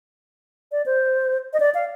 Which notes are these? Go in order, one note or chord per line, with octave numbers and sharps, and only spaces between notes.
D5
C5
D#5
D5
F5